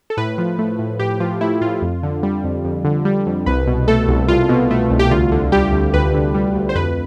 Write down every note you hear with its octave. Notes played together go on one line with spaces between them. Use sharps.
A4
A2 B4
F3
A3
A2
A2 G4
F3 F4
A3 E4
A2 F4
F2
D3
G3
F2
F2
D3
G3
F2
C2 B4
B2
A3 A4
C2
C2 F4
B2
A3
C2
G4
D2 F4
D3
G3 G4
D2
D2 B4
D3
G3
D2
C5
F2 B4